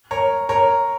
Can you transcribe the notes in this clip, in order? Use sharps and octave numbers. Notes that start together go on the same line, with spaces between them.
A#4 C#5
A#4 C#5